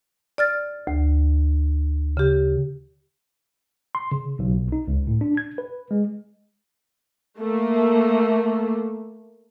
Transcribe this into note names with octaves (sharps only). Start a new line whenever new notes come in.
D5 F6 A6
D2
C#3 G4
C6
C#3
B1
D#4
C#2
A2
D4
G#6
B4
G#3
A3 A#3